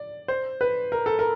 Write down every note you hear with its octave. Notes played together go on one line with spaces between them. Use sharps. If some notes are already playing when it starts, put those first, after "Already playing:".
Already playing: D5
C5
B4
A#4
A4
A#4